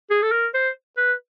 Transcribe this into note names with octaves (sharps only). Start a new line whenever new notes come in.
G#4
A4
A#4
C5
B4